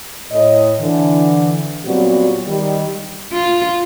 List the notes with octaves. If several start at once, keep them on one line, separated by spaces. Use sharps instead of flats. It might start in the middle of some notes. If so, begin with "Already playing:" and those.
A2 C#5 D#5
D3 E3
A#2 F#3 G3 B3 C4 F#4
D#3 G3
F4